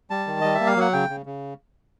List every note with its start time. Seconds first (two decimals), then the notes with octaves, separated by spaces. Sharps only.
0.10 G3 A5
0.27 D#3
0.41 G3 D#5
0.55 E5
0.60 A#3
0.66 F5
0.77 F#3 F#5
0.93 C#3 G5
1.10 C#3
1.26 C#3